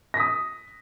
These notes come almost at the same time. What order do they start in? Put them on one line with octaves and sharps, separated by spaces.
A#6 B6 D#6